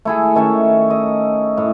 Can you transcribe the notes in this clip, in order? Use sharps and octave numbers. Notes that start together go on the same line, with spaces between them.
A3 E4 G#4
D#3 A3 C#4 E5
D#5
A2